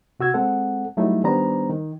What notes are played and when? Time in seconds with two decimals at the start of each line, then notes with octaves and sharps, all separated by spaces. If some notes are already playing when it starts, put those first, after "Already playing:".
0.20 C3 F#4 E6 G#6
0.34 G#3 C4 A4 F#5
0.97 F#3 G3 A3 D#4 E4 E5
1.24 D#3 G3 B3 D4 C5 A#5
1.69 D#3